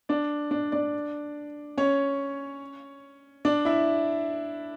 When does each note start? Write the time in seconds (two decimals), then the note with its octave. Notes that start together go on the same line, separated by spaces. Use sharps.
0.09 D4 D5
0.51 D4 D5
0.72 D4 D5
1.77 C#4 C#5
3.45 D4 D5
3.65 E4 E5